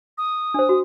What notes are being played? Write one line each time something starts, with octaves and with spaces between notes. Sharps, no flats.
D#6
D4 C5
F#4